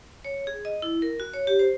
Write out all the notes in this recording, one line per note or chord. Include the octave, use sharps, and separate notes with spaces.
C#5
G#4
D#5
E4
A#4
F#4
C#5
G4
C5